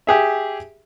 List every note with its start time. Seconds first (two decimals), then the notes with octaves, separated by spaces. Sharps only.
0.07 G4 G#4 E5